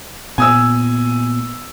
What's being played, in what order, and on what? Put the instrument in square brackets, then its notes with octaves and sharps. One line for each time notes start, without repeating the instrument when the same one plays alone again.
[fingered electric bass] A#2 B3 [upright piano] G#5 D#6 E6